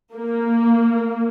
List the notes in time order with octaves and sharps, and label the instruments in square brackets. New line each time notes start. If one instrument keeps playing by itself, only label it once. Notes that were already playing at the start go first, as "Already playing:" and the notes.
[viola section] A#3